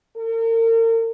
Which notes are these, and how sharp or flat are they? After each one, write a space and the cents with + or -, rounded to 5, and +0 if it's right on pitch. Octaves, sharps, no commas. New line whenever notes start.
A#4 -40